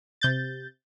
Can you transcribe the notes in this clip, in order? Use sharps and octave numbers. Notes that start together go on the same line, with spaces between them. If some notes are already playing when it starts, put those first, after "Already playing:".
C3 G6 A6